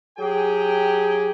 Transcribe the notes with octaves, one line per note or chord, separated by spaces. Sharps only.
F#3 G4 G#4 G5 G#5